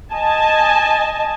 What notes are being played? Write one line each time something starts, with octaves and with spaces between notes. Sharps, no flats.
D#5 G#5 A5